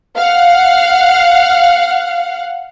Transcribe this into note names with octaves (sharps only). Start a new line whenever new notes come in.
F5 F#5